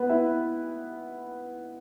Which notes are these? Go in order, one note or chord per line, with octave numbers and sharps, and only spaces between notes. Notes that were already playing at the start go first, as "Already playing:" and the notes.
Already playing: B3 B4
E4 E5